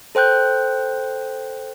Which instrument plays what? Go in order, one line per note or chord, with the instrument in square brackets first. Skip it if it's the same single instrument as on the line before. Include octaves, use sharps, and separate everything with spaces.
[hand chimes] A4 C5 G5 F#6 G6